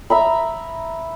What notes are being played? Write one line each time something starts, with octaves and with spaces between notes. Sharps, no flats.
E5 A#5 B5